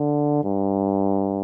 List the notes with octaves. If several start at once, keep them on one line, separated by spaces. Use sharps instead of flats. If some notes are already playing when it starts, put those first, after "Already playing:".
Already playing: D3
G2